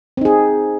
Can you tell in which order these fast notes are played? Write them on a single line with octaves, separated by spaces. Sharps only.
C4 D#4 G#4